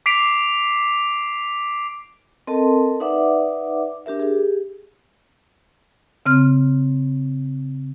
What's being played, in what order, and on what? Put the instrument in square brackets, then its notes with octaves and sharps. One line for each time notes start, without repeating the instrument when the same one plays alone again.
[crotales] D6 B6 C7 D7 F7
[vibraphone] C4 A4 A#4 D#5 A5 C6
D#4 B4 D5 E5 F#5 D6
D4 G4 A#4 E5
G4 G#4
[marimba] C#3 C4 F6